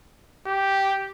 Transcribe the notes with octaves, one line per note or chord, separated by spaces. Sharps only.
G4